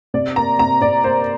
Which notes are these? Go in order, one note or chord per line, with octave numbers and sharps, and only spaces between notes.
C3 D5
A#3 A#5
C3 A#5
C3 D5
A#3 C5